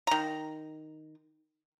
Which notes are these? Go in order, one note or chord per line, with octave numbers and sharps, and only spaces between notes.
D#3 A#5